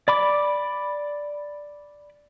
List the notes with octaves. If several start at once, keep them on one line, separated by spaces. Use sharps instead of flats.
D5 B5 D6